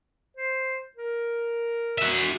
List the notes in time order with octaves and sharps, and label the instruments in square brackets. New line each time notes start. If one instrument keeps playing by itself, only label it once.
[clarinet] C5
A#4
[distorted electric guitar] F#4 E5